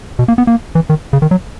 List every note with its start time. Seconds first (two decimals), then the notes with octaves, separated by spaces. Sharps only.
0.19 B2
0.28 A#3
0.38 B3
0.47 A#3
0.75 E3
0.90 D#3
1.13 C#3
1.22 D#3
1.31 F#3